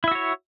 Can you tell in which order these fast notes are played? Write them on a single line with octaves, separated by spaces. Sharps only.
E4 E5 F#4 C#5